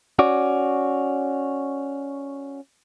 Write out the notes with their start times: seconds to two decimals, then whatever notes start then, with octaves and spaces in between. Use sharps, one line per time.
0.19 C#4 F#4 D5